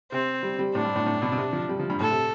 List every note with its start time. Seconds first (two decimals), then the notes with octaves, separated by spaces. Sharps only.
0.12 C3 C4
0.43 G3
0.59 G3
0.75 A2 D4
0.85 G2
0.96 A2
1.06 A2
1.22 B2
1.32 B2
1.38 C3
1.53 F3
1.69 G3
1.79 F3
1.90 G2
2.00 A2 A4
2.10 C3